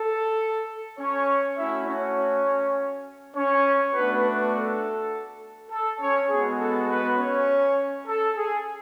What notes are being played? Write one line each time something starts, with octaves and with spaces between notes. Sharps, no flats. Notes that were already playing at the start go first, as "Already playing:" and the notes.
Already playing: A4
C#4 C#5
A3 C#4 E4 F#4 E5
C#4 C#5
C#4 C#5
A3 B3 D4 F#4 B4
B3 B4
A4
A4
C#4 C#5
G#3 B3 F#4 G#4
A4
B3 B4
C#4 C#5
A4
G#4